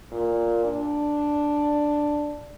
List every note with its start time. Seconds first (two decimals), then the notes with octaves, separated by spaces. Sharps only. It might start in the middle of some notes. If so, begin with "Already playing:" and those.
0.12 A#2
0.64 D4